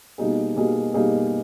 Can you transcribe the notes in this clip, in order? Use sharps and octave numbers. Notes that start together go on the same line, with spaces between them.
B2 G3 A#3 D#4 G#4
B2 G3 A#3 D#4 G#4
B2 G3 A#3 D#4 G#4